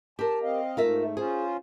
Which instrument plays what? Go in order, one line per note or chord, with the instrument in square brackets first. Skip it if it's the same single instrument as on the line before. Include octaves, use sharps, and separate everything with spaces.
[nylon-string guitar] G4 A#4 [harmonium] A5
[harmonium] C4 D#5 F5
[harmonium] G#2 A3 [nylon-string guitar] F4 A#4 E5
[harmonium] C#4 F4 C5 [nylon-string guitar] G#4